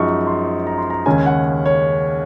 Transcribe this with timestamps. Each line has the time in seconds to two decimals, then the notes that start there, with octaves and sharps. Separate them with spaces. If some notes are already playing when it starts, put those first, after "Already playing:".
Already playing: F#2 F3 G#3 D#4 C#6
0.27 C6
0.67 A#5
0.78 C6
0.90 A#5
1.06 D#2 C#3 G#3 C#4 G#5
1.26 F#5
1.66 C#5